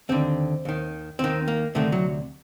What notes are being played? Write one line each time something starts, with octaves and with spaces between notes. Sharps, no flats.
D#2 D3 C4
D#2 D#3
D#2 D#3 C4
A#3
D2 C3 D#3 A3
F#3